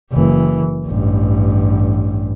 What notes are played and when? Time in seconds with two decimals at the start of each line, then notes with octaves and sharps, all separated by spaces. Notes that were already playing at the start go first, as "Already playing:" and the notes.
0.12 F#1 E3
0.86 A1 G2